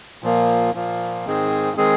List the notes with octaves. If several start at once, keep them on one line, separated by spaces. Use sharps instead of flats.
A#2 F3 A#3
A#2 F3 A#3
G#2 D#3 G#3 C4 G#4
D#3 G#3 C4 G#4